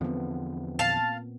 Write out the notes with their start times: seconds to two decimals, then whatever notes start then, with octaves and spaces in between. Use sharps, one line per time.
0.01 E2 D3 F3 B3 C4
0.79 A#2 F5 A5